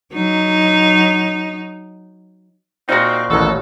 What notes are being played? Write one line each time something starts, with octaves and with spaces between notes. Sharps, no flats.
F#3 D#4
A#2 C4 D#4 F#4 C6 C#6
A1 D#2 B2 F#3 A4